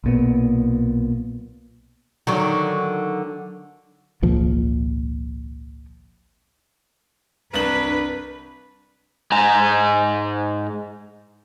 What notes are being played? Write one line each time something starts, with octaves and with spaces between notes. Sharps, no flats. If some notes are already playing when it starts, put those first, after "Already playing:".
B1 A#2 B3
D3 D#3 F#3
G#1 C#2 A#2 F3
C2 D4 B4 F#7
G#2 G#5 A#5